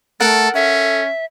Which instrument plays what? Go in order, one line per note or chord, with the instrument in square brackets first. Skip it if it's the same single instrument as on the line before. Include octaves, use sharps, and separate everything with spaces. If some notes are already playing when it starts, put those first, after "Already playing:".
[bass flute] A3 [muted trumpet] A4 [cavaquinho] A#4 F#5
[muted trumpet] C#4 [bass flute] A4 [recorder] E5